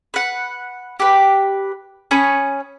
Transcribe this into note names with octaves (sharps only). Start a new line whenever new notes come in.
B4 F#5
G4 B4
C#4 B5 C#6 D#6